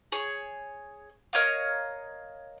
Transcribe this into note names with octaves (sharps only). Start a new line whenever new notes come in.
G#4 C#5
A#4 C#5 D#5 F5